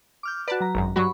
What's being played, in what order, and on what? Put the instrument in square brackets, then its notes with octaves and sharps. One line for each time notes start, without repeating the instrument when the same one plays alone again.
[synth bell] D6 F6 G6
[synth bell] F#4 B4 [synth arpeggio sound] D5 A5
[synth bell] F#3 A#5
[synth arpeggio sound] G#1 F#2
[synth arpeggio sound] G2 F#3 F#4 [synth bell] B5 C#6